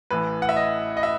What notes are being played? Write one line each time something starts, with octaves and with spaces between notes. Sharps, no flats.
A1 A2 E3 B4
F#5
E5
D#5
D#5
E5